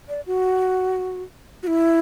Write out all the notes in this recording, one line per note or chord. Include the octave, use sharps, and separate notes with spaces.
D5
F#4
F#4
E4